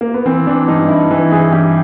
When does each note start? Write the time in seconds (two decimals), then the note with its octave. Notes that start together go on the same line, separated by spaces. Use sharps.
0.01 A#3
0.14 B3
0.26 E3 C4
0.47 E3 D4
0.68 G2 D#4
0.89 G2 E4
1.11 E3
1.32 E3 G#4
1.52 G2 G4